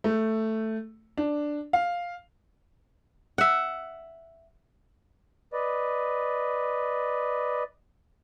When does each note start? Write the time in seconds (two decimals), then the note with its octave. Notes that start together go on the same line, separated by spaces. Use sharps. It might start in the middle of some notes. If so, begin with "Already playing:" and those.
0.04 A3
1.17 D4
1.73 F5
3.38 E5 F#5
5.53 B4 D5 D#5